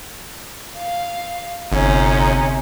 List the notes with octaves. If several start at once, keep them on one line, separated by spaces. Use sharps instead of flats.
F5
G1 C3 C#4 D#4